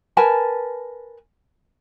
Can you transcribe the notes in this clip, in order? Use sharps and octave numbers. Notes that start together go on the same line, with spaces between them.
A#4 B4 G#5 A5